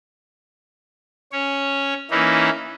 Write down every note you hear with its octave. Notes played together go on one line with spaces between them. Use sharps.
C#4 C#5
E3 A#3 C#4 D#4 E4